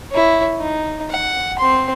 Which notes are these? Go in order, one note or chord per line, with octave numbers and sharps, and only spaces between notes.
E4 C#5
D#4
F#5
C4 C6